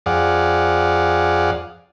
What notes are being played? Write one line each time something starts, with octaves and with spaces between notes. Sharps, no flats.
F2 G#4 D5 F5 F#5